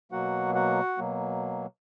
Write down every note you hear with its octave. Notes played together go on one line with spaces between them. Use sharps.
B2 F#3 A#3 F#4 F#5
F#4 F#5
B2 F#3 A#3